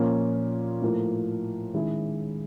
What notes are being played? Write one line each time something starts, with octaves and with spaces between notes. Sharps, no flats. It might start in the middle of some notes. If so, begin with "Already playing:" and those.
Already playing: A#2 F3 A#3 C#4 F4
A2 F3 A#3
D#3 G#3 C#4 E4 G#4